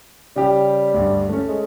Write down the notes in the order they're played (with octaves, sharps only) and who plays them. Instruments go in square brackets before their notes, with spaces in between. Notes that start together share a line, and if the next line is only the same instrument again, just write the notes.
[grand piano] C#3 G4 [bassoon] G3
[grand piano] D2 G2
A3 C#4
[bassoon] G#3